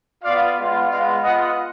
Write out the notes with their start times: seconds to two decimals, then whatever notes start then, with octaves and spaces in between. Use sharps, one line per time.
0.23 B3 F4 D5 F5
0.57 G#3 B3 F4
0.90 G#3 B3 F4 D5 F5
1.23 B3 F4 D#5 F#5